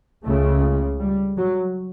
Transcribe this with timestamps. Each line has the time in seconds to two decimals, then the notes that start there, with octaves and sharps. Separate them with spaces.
0.25 C#2 C#3 A3
1.00 G3
1.38 F#3